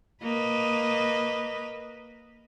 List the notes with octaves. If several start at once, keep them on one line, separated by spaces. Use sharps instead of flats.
A#3 B4 D#5